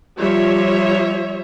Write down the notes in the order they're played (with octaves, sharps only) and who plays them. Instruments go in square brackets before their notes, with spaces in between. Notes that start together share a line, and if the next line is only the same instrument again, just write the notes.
[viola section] F3 G3 F4 C#5 E5